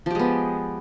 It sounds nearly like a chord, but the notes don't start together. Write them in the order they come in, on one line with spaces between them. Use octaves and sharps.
F3 G4 G#3 B3